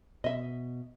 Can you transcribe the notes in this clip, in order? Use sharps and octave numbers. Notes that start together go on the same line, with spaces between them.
B2 D#5 E5